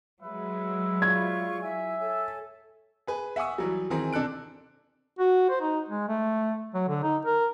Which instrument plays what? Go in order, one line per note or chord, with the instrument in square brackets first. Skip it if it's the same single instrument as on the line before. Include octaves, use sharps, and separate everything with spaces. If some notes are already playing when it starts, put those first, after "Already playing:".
[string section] F#3 G#3 [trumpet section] B4 E5
[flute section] F4 D5 C#6 [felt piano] G#6
[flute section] E4 G#5 [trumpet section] E5
[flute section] A4 C#5 G#5
[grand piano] G#4 B4 G#5
E5 F#5 G#5 C#6 D#6 E6
E3 F#3 G3
D#3 E3 C4 G#4 A#5
C3 D4 A4 F#6 D7
[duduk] F#4
C5
D#4
G#3
A3
F#3
D3
D#4
A#4